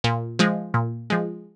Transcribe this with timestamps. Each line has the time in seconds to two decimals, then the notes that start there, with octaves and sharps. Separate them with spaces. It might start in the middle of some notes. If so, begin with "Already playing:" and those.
0.04 A#2
0.39 F3 G#3
0.74 A#2
1.10 F3 G#3